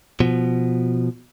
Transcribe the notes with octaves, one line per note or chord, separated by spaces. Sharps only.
B2 F3